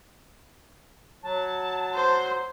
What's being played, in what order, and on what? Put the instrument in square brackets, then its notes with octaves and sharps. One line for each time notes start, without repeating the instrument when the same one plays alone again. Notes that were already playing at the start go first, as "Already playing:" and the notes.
[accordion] F#3 [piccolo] A5
[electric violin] C5